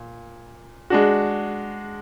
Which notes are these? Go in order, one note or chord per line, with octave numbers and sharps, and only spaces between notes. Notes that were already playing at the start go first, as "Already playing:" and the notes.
Already playing: A#2
G#3 D4 F#4